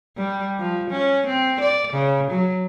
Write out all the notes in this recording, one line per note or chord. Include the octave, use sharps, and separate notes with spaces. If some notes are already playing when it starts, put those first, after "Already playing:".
G3
F3
C#4
C4
D5
C#3
F#3